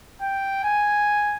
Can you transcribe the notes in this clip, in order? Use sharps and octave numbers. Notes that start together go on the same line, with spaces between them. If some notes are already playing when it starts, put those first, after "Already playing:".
G5
G#5